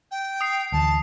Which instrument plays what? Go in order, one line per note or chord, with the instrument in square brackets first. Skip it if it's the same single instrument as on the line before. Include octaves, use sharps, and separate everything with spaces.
[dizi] G5
[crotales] D#6 C7
[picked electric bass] D2 E3 [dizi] A5